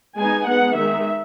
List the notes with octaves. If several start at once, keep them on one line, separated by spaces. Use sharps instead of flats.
G#3 B3 D#4 G#5
G#3 B3 D#4 F#5
D#3 G#3 D#4 E5